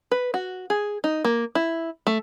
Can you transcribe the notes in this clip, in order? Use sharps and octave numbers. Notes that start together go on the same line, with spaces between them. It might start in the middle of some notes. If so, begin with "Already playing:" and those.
B4
F#4
G#4
D#4
A#3
E4
A3